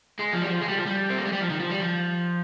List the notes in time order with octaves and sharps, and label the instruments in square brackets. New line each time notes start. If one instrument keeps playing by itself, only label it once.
[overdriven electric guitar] G#3
F3
G3
F3
G#3
G3
F3
G3
C4
A#3
G#3
G3
F3
D#3
F3
G3
F3